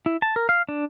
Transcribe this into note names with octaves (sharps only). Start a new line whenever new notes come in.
E4
A5
A#4
F5
D4